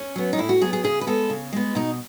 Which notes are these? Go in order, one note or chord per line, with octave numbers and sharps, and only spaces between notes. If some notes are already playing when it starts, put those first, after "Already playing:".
Already playing: C#4
F#3 B3
D#4
A2 E4
F#4
F#3 B3 G#4
G#4
C#3 G#4
B4
G#3 B3 A4
C#3
G#3 B3
B2 D#4